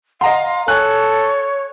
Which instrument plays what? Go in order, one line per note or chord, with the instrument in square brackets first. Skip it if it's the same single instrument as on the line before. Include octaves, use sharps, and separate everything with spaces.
[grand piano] D#5 A#5 C6 [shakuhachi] F5 [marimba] F#5
[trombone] A4 [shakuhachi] C#5 [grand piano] G#5 F#6